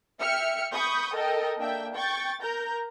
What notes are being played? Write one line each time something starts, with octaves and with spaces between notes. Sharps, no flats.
E5 G5 F6 C#7
B5 C#6 D#6 G6
A4 A#4 D#5 G5
A#3 D4 E5 G5
G5 C#6 G6 A6
A#4 A#5 G6